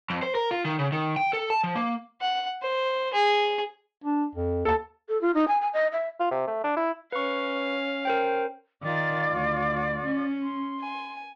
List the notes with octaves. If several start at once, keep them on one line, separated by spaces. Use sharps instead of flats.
F2
C5
A#4
F4
D#3
C#3
D#3
G5
A4
A5
F3
A#3
F#5
C5
G#4
D4
F2
D#2 A4 A5
A4
F4
D#4
G#5
G#5
D#5
E5
F4
C3
A3
D4
E4
C#4 B4 F5 C#6
A#4 C5 G5
D#3 F4 D5 D6 A6
D2
C#4
C6
G#5